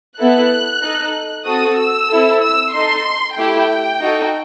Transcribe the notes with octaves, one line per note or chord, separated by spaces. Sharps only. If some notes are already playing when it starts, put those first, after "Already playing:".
B3 E4 A4 F#6
D#4 A4
C4 F#4 A4 D#6
E6
C4 E4 A4
E6
D#4 A4 C6
A3 E4 G4 G5
D#4 F#4 A4